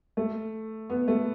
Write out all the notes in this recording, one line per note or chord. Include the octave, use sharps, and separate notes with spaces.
A3
B3
A3